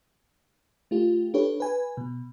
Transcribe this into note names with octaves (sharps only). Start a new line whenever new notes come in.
A3 F4 G4
D4 G4 A4 B4 C#5
B4 G#5
B2